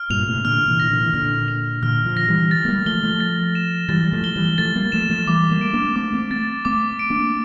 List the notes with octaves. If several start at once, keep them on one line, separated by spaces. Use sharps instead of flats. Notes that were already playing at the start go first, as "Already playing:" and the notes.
Already playing: F6
G2 A#2 F7
A2 C3
A#2 D3 F6
C3 E3
E3 A#6
A#2 D3
E3
A#2 D3 F6
F7
A#2 D3 F6
D3 F3
A#6
E3 G3
A6
A3
G3 A#3
F3 A3 G7
F3 A3
A6
E7
E3 G3 A6
G3
F3 A3
G7
E3 G3
F3 A3 A6
G3 A#3
F3 A3 E7
F3 A3
E3 G3 D6
G3 A#3
D7
A#3 D4
A#3
A3 C4 D6
A3 C4
A3 C4 A6
A3 C4 D6
D7
A#3 D4